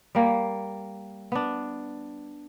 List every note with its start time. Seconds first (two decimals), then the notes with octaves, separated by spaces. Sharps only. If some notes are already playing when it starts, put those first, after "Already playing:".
0.15 G3 A#3
1.32 B3 D4